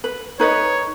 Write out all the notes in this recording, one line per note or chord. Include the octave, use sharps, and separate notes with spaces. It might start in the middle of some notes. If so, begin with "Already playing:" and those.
B4
D#4 B4 C#5 D#5